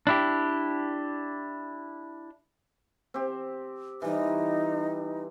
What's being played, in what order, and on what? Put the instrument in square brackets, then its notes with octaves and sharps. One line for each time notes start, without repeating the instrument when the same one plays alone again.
[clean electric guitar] D4 E4 G4
[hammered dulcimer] C4 G4
[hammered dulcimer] E3 G3 [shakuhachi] D#4